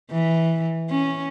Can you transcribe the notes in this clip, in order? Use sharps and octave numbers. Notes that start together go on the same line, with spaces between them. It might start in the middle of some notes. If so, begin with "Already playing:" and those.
E3
C#4